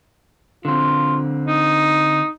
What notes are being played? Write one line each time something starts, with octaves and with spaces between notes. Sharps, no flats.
D3 C4 F4
D#4